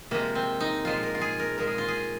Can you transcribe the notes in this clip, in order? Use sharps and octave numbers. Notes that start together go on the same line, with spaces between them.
C3 F3 G#3 A#3
C4
D#4
A#2 F3 G#3 F4
A#4
F4
G#4
A#4
A#2 F3 G#3 A#4
G#4
F4
G#4